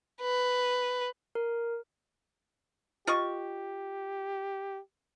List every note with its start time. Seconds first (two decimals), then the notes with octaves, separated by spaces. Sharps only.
0.21 B4
1.35 A#4
3.07 F4 G4 D#5 C#6